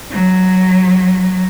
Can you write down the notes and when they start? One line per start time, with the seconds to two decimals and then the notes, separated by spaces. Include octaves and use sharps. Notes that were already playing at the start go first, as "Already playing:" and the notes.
0.11 F#3